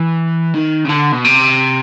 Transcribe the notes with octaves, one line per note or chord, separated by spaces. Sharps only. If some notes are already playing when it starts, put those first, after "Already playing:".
Already playing: E3
D#3
C#3
D3
B2
C3